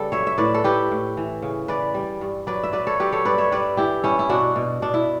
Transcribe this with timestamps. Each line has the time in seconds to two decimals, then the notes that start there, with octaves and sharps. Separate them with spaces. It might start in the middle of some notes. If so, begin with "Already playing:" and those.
Already playing: C#3 G3 A4 B4
0.12 F#3 C#5 E5
0.27 E5
0.38 A2 B4 D5
0.54 A4
0.64 A2 G4 B4
0.91 A2
1.17 E3
1.43 C#3
1.68 E3 B4 D5
1.94 G3
2.21 G2
2.47 F#3 B4 D5
2.63 E5
2.73 F#3 B4 D5
2.87 A4 C#5
2.99 F#3 G4 B4
3.12 A4 C#5
3.25 G2 B4 D5
3.38 C#5 E5
3.51 G3 B4 D5
3.77 E3 E4 G4
4.04 G2 C#4 E4
4.19 E4
4.29 B2 D4 F#4
4.56 B2
4.82 B2 D4
4.94 E4